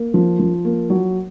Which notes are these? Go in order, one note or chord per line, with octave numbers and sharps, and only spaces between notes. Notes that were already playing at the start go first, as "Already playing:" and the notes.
Already playing: A#3
F3
F3
A#3
F#3